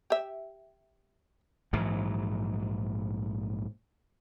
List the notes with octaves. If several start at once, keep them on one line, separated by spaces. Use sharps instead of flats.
G4 E5
A#1 G#2 E3 F#3